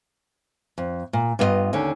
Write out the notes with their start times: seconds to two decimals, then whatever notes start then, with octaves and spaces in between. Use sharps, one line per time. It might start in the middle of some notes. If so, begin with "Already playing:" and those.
0.78 F2
1.13 A#2
1.39 G2 B3 E4 F4 D#5
1.73 D#2 D3 C#4